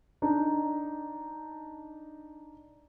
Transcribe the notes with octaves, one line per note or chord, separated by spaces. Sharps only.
D4 D#4